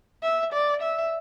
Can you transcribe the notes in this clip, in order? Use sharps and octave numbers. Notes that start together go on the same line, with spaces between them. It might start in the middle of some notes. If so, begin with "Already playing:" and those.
E5
D5
E5